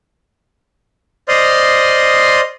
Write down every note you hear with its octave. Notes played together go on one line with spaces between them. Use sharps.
C5 D5 D#5 C6 D#6 F6